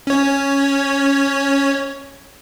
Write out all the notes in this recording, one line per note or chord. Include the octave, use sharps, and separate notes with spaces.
C#4 C#5